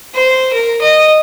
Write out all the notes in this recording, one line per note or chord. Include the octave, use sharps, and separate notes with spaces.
C5
A#4
D#5